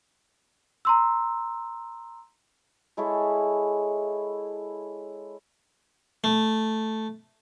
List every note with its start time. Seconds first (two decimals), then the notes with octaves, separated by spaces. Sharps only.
0.85 A#5 C6 E6
2.97 G#3 E4 A4 C#5
6.24 A3